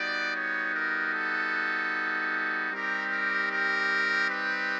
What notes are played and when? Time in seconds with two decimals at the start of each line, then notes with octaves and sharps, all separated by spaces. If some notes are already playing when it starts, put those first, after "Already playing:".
Already playing: G3 B3 D#4 F#4 D5
0.34 C#5
0.73 A#4
1.14 A4
2.70 G3 C4 D#4 G4 A#4
3.10 A#4
3.50 A#4
4.29 B4